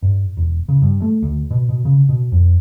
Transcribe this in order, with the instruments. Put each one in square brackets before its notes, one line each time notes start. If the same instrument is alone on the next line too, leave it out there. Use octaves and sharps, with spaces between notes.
[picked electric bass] G2
E1
C#3
G2
A3
D2
B2
B2
C#3
B2
F2